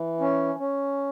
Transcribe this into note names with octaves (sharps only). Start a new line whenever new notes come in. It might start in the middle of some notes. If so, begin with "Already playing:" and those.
Already playing: E3
C#4
C#4